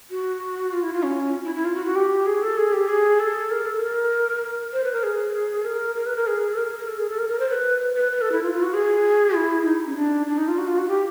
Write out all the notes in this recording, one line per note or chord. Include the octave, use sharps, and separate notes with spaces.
F#4
F4
E4
F4
C#4
E4
E4
F4
F#4
F#4
G4
G#4
A4
G#4
G4
G#4
A4
A#4
A4
A#4
C5
B4
A#4
G#4
A#4
A#4
B4
A#4
G#4
A4
A#4
A#4
A4
G#4
A4
A#4
A#4
C5
B4
B4
B4
A4
E4
F4
F4
F#4
G#4
E4
D#4
C#4
D4
D4
D#4
F4
F#4
F4
F#4
G4